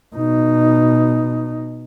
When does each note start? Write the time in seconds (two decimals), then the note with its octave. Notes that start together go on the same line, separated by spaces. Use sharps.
0.15 B2 D#4